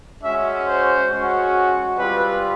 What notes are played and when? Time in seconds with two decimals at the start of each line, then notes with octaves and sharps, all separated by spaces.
0.22 G#3 C#4 F#4 E5
0.66 C5
1.09 G#3 C#4 F#4
1.97 G3 C4 F4 B4